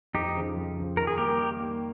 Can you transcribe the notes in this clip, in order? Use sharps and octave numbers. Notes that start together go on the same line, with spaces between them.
F2 D#4 G4
C#3 F3
F2
C#3 F3
D#3 A#4
G#4
G3 A#3 G4 A#4
D#3
G3 A#3